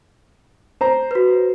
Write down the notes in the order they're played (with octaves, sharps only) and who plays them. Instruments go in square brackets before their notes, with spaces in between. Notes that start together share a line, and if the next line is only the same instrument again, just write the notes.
[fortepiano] C5 A#5
[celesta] F#4 B4